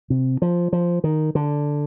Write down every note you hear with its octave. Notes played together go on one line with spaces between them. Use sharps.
C3
F3
F3
D#3
D3